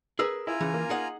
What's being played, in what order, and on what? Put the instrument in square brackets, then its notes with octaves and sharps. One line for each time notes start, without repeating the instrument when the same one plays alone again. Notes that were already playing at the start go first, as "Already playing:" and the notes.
[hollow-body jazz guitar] G#4 A#4 B4 [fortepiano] E6
[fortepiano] E4 [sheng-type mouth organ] F4 G#5 A#5
[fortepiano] C#3 [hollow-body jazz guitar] E3
[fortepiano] A#3
[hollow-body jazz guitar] D#4 G#4 F#5